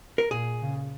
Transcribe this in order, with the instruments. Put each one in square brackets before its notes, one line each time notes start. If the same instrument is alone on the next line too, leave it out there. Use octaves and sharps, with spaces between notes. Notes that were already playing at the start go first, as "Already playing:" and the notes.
[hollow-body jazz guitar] A#4
[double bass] A#2 [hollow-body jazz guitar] G#4
[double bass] C#3